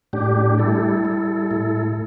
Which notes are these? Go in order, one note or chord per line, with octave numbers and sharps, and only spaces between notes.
A2 D4 G4
G3 E4 A4
G3
A2